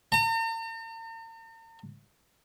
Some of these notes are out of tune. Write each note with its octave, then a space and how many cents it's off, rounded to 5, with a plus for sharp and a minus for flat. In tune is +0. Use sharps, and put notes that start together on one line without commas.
A#5 -45